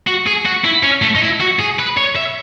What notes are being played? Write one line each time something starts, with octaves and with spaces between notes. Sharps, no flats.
F#4
G#4
F#4
E4
C#4
A3
D#4
E4
F#4
G#4
B4
C#5
E5